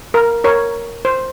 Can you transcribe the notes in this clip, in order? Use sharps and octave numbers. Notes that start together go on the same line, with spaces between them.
A#4
A#4 C#5
C5